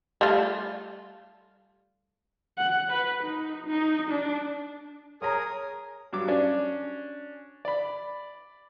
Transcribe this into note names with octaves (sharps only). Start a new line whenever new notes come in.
G3 A3 F4
F#5
B4
D#4
D#4
D4
G#4 A#4 C#5 A#5 D#6
G2 F#3 D6
C#4 D4
D5 B5